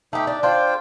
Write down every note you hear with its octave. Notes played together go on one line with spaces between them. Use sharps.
A3 D#4 G4
D4
D4 F4 C5 G5